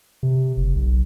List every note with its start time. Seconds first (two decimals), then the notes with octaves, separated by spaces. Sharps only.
0.23 C3
0.57 F#1
0.75 B1